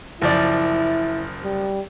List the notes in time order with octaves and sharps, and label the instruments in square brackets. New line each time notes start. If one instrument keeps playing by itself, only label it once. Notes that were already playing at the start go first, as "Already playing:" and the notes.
[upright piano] F#1 F3 D5 [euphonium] E4
[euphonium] G3